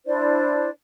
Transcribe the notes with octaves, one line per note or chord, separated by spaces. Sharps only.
D4 E4 C5 D5